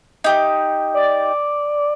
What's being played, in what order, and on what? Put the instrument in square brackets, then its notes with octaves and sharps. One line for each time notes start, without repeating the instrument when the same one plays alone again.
[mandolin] D#4 G4
[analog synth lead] D5